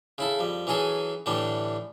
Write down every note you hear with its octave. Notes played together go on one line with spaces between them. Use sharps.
C#3 E4 A4
F2 G3
E3 F#3 C#4 G#4 A4
A2 D3 E3 G3 D4